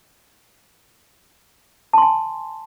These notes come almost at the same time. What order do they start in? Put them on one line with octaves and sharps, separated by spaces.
A5 C6 G#5